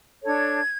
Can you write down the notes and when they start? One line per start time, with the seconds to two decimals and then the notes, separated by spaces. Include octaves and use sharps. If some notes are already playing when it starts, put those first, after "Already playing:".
0.23 D4 A4 C#5 G#6